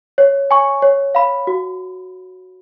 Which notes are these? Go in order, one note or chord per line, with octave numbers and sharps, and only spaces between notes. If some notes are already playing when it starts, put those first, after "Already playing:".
C#5
G#5 C#6
C#5
F5 B5
F#4